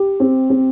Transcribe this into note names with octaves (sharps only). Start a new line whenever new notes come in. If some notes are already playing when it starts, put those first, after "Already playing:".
Already playing: G4
C4
C4